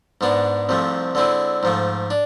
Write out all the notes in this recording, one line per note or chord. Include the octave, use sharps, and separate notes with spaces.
G#2 G#3 B3 D4
C2 C3 F3 A3
D3 G#3 C4 E4
G#2 F3 A3
D4